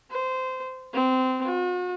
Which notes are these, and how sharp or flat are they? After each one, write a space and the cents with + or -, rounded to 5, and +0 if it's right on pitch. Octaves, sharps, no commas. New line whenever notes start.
C5 -20
C4 -20
F#4 -45